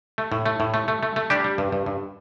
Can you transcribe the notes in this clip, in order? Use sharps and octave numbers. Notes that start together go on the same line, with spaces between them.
A3
A2
A3
A2
A3
A3
A3
A3
G3 D4 G4
G3
G2
G2
G2